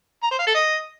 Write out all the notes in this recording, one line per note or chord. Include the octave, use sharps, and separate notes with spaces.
A#5
C5
F5
A4
D#5